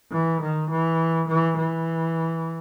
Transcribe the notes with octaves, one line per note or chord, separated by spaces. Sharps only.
E3
D#3
E3
E3
E3